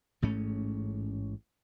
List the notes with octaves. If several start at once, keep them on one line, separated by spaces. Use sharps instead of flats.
A1 G#2 A3 C#4